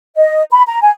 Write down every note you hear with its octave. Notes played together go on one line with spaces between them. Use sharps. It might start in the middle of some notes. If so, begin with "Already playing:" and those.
D#5
B5
A#5
G#5